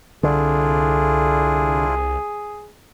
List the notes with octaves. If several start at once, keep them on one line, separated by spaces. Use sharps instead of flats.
C2 D3 D4 E4 F4 G#4